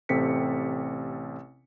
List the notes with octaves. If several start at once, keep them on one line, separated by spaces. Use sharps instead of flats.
A1 C3 C4 A4 B6 C#7